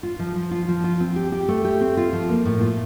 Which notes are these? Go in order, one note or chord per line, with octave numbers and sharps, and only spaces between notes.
F4
F3
F3
F4
F3
F4
C4
G4
G4
A3
G4
C4
F4
F3
A#3
A2
F4